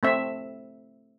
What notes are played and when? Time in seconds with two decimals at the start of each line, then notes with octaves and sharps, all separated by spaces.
0.03 A3 C4 E5